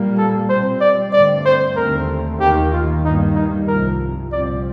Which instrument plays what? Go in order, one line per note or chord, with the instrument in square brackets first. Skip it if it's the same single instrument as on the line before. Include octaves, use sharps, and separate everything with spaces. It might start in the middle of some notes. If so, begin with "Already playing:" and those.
Already playing: [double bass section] A#2 G3 A#3
[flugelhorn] A4
[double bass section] A#2 G3 C4 [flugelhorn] C5
[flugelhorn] D5
[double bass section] G2 D3 A3 C4 [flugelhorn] D5
[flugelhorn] C5
[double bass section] D#2 D3 A3 C4 [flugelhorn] A#4
[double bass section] D#2 D#3 A#3 [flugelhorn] G4
[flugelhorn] F4
[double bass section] G2 D#3 G3 A#3 [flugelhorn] D#4
[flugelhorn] D#4
[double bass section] C2 C3 F3 [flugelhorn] A#4
[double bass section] C2 A#2 F3 C4 [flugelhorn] D5